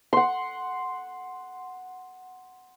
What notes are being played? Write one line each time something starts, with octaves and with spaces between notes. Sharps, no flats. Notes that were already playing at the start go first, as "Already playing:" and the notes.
F#5 C6